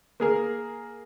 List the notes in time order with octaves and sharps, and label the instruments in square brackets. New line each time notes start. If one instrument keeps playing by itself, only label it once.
[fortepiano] A#3 G#4 A#4